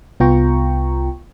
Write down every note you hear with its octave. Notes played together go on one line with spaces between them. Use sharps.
C2 B3 F4 G5 A#5 C#6